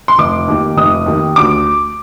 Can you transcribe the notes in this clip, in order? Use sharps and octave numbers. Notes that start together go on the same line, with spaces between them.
C6
F1 D6
D#2 D#3
F1 D#6
D#2 D#3
D2 D6